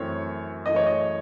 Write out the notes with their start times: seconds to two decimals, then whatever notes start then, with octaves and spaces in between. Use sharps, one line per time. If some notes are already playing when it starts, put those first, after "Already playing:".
Already playing: F#2 E3 A3 C4 C#5
0.66 F#2 E3 A3 D#5
0.76 C#5
0.86 D#5